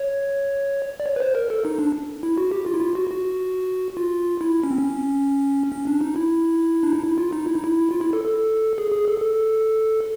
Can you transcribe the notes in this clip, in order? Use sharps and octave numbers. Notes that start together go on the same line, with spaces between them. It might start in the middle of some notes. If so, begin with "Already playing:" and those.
Already playing: C#5
D5
C#5
B4
C5
A#4
A4
D#4
D4
E4
F#4
G4
F4
E4
F4
F#4
F#4
F4
E4
C#4
C4
C#4
C#4
D4
D#4
E4
D4
D#4
E4
F4
D#4
E4
D#4
E4
F4
E4
A4
A4
G#4
G#4
A4
A4